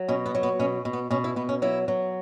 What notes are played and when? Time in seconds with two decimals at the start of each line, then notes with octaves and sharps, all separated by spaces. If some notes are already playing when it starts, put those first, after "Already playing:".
Already playing: F#3
0.08 B2 C#4
0.26 B3
0.35 F#3
0.43 B3
0.59 B2 C#4
0.85 B2
0.93 B3
1.11 B2 C#4
1.24 E4
1.36 B2 B3
1.49 C#4
1.62 F#3 E4
1.88 F#3